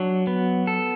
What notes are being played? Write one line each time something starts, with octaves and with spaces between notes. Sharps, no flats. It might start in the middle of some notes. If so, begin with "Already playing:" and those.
Already playing: F#3 D4
B3
A4